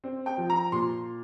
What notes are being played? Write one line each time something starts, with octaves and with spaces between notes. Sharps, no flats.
C4
G5
F3
A#5
A#2 C6